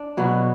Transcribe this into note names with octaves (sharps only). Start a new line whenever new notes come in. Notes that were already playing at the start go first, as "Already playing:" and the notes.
Already playing: D4
B2 F#3 B3 F#4